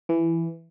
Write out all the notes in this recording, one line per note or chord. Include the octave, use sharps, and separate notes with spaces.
E3